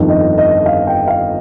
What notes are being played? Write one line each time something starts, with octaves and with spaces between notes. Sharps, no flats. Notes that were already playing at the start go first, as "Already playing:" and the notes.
Already playing: G1 F2 D#3
D#5
D#5
F5
G5
F5